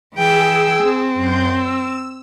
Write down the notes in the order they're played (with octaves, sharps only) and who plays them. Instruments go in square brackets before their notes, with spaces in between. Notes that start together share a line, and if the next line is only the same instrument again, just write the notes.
[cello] E3 G5 [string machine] G#4 E6
[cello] C4
[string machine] F#2 C6 G6
E6